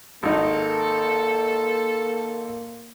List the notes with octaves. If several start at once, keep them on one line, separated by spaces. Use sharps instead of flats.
G#1 A#3 D#4 A4